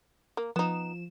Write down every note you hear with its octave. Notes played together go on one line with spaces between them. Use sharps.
A#3
F3 B3 D#4 E7